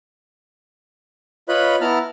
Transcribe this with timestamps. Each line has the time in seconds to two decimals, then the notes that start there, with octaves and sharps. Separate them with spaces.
1.49 F4 B4 C#5 D#5 B5 F#6
1.81 B3 E4 A5 A#5 F6